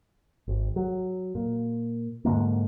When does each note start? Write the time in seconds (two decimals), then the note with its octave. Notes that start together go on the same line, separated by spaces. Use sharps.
0.48 G#1
0.76 F#3
1.35 A#2
2.25 G#2 D3 G#3 A#3